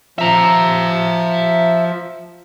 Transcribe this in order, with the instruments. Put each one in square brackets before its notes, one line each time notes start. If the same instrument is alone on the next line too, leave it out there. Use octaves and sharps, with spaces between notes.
[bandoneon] F3 [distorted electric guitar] E5 A#5